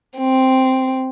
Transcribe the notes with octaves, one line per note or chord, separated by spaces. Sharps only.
C4